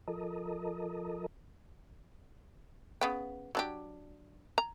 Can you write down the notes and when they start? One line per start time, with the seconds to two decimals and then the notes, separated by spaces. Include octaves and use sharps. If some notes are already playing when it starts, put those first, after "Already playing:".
0.08 F3 A4 A#4 D#5
3.01 C#3 B3 G5
3.55 F#3 D4 G4
4.58 A#5